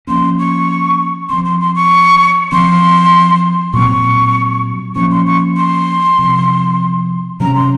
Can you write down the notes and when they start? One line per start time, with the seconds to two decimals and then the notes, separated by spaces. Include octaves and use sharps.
0.07 F3 A#3 C#4 C6
0.39 C#6
1.29 F3 C4 C6
1.45 C6
1.60 C6
1.76 C#6
2.52 F3 C4 C6
3.73 A#2 F#3 C4 C#6
4.96 F3 A#3 C#4 C#6
5.11 C6
5.27 C#6
5.57 C6
6.18 C3 F3 C4
7.40 C3 F#3 C#4 A#5
7.55 C6